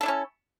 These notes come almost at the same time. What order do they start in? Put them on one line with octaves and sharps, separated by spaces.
A4 D4 E4 C#4